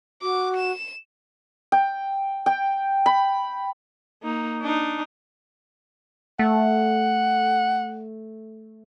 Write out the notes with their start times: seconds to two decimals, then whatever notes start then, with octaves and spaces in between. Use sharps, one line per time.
0.22 F#4 D6
0.56 E7
1.72 G5
2.46 G5
3.06 B5
4.23 A#3 D#4
4.62 D4 D#4
6.39 A3 F#5